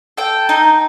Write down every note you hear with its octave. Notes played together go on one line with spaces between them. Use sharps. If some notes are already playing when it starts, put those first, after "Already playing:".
A4 G5
D#4